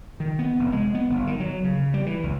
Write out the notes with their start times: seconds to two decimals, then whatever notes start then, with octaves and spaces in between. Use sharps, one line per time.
0.20 D#3
0.39 B3
0.59 F1
0.72 G#3
0.95 B3
1.10 G1
1.27 D#3
1.40 F#3
1.64 C#3
1.94 G3
2.06 E3
2.23 C#2